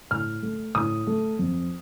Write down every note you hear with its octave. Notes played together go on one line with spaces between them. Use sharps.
A2 F6
A3
A2 D#6
A3
F2